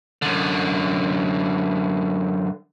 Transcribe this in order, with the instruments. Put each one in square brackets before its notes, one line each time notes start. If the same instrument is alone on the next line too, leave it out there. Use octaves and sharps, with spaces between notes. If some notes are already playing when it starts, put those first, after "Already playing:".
[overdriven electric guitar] F#2 D3